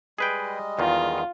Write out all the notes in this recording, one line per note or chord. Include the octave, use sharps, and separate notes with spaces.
G3 G#3 G#4 B4 D#5 G5
E2 D#3 F4